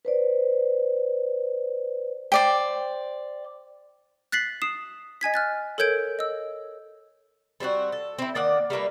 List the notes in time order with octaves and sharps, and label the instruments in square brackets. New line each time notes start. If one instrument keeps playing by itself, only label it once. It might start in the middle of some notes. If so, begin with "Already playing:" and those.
[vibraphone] B4 C5 D5
[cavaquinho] C5 D5 G5
[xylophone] F#6 A6 B6 C7 F#7
D#6 C7 E7
D#5 G#5 G#6 B6
F6 F#6 A6
A4 A#4 C#5 G6 G#6 D7
D#5 E6
[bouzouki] G3 C4 E4 F#4
A4
C4 E4
D#3 A#3 D5 F#5
G3 A3 A#3 B4